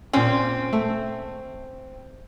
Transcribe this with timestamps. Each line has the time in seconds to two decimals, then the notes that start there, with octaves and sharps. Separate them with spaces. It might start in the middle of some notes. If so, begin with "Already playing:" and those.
0.13 A#2 C4 C#4
0.73 A3